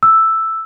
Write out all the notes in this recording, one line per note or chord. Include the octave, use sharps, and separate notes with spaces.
E6